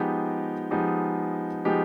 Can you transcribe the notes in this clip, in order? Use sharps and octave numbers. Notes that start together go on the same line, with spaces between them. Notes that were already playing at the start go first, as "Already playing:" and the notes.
Already playing: F3 G#3 B3 D#4 G4
F3 G#3 B3 D#4 G4
F3 G#3 B3 D#4 G4